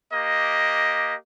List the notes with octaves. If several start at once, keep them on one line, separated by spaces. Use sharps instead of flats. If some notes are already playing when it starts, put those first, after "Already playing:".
A#3 G4 D#5